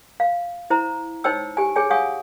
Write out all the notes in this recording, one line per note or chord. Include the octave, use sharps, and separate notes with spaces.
F5
E4 C5 A#5
D#4 C5 C#5 G5 E6
G4 G#5
G#4 C#5 G5 G#5
C#5 F5 F#5 G#5 C#6 D#6